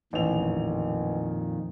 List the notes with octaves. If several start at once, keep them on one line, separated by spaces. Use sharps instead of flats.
A1 F2 A#2 D#3 F7